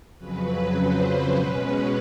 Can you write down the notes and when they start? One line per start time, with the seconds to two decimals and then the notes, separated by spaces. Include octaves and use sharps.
0.18 F2 C#3 F#3 B4
0.76 C5
1.36 B2 G#3 C#4 B4
1.65 B4